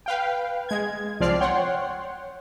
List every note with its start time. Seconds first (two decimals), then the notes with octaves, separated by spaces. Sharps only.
0.06 B4 F5 G5
0.69 G#3 G#6
1.20 C2 F3 C4 D5 F6 C7
1.40 C#5 F#5 G5 C6